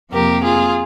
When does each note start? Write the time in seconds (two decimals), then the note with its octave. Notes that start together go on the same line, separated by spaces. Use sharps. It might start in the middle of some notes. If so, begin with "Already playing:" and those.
0.12 F2 C3 F3 A#3 G4 A#4
0.44 F4 G#4